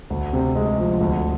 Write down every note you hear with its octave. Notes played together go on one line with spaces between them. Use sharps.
D2
C3
G#3
F3
D2